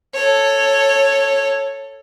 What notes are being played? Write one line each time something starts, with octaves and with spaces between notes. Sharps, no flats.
A4 C#5